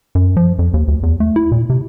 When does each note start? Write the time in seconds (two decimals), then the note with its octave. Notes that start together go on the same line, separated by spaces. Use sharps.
0.15 F#2
0.37 F3
0.59 F2
0.74 D#2
0.88 D2
1.03 E2
1.20 A3
1.36 E4
1.52 A#2
1.70 C3